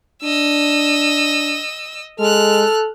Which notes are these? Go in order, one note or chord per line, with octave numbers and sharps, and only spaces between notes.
D4 D#5 E6
G#3 A4 F6 F#6